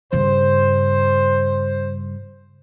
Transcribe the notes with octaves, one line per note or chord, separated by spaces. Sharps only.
G2 C#3 C5